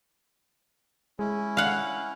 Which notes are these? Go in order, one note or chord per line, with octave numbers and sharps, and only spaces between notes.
G#3 C#4 E4
F5 F#5